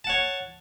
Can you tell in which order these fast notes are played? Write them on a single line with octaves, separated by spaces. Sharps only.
A5 F#5 C#5